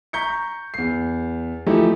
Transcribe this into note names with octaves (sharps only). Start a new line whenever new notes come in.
A#5 C#6 G6 B6 C#7
E2 C7
E3 F3 A3 D#4 E4 G4